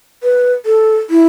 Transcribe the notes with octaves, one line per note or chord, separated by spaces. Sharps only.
B4
A4
E4